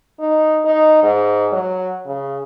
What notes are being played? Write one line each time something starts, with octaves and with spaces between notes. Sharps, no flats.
D#4
D#4
G#2
F#3
C#3